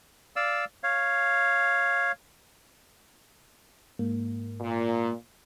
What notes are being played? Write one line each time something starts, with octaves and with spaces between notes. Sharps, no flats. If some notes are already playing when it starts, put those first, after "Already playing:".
D5 F5 E6
C#5 F5
G#2 A#3
A#2